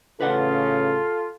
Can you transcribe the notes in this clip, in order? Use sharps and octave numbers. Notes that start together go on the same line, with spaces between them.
A1 C#3 C#4 F4 A4 B4 D5 F#5